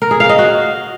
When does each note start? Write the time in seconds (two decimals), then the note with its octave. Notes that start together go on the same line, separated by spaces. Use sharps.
0.02 A#4
0.11 G#4
0.20 F5
0.29 D#5
0.39 F#4